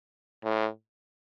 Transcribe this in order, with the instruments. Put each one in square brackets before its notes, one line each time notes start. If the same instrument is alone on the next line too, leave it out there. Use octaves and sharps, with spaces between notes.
[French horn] A2